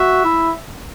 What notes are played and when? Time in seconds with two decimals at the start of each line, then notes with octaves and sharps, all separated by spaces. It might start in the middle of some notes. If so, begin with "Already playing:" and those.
Already playing: F#4 E5
0.24 E4